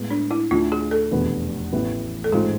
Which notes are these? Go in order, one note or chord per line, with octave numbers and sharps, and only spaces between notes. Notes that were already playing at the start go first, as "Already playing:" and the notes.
Already playing: A2 G#3 B3
D4
E4
D2 D3 A3 D4 F4
G#4
A4
F1 E2 B2 B3 D4
A1 A2 E3 B3
A4
A1 G#2 G#3 C4 F4 G#4